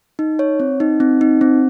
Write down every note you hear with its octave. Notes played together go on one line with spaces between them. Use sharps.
D#4
C#5
C4
D#4
C4
D#4
C4